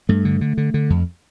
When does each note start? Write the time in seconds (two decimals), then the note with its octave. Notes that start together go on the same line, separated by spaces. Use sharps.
0.09 G2 A3
0.25 D3
0.41 D3
0.57 D3
0.74 D3
0.90 F2